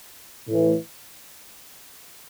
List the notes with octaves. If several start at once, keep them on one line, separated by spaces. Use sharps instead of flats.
A2 E3